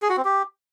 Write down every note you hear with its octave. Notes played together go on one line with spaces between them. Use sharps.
G#4
F#4
C4
G4